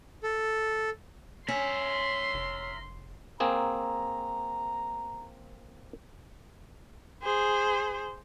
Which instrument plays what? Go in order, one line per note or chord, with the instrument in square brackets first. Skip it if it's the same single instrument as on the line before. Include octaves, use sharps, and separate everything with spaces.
[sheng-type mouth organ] A4
[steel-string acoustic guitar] C#4 [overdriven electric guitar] A#4 E5 [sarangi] C6
[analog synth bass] F1
[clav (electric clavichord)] A#3 C4 G#4 [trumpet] A#5
[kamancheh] G#4 C5